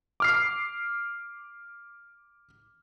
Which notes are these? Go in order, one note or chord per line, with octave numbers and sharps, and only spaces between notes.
D6 F6 C7